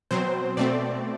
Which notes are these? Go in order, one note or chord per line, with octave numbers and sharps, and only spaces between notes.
B2 F#3 C4 C5
B2 A3 C4 D5